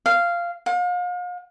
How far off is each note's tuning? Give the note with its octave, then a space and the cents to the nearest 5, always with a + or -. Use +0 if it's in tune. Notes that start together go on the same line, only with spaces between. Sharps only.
F5 -10
F5 +40